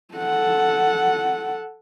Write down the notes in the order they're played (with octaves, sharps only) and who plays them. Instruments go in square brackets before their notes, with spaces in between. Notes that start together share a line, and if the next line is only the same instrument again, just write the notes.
[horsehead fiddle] A4 F#5